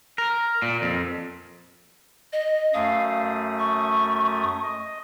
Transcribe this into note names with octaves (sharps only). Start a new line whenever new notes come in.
A#4
A#2
F2
D#5
F#2 A3 F5 D#6
C#6
D#5